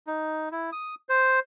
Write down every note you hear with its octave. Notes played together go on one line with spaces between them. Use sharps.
D#4
E4
D#6
C5